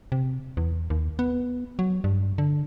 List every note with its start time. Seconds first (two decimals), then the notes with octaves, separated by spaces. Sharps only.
0.12 C3
0.57 E2
0.90 D#2
1.19 B3
1.79 F#3
2.04 G2
2.38 D3